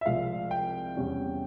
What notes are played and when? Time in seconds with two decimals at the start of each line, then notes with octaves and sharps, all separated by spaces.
0.01 E5
0.06 C2 C3 F3 G#3 F5
0.51 G5
0.96 E2 C3 G3 C#4